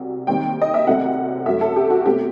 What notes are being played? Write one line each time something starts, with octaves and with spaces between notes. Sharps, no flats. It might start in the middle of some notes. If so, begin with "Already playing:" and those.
Already playing: C2 C3 F#3
D#2 D#3 G3 C4 G5
D#5
E5
C2 C3 F#3 A3 C4 F#5
F#2 F#3 A3 E5
A4
G4
F#4
B2 A3 C4 G4